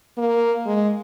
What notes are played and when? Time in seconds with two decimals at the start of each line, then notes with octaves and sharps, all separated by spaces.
0.18 A#3
0.66 G#3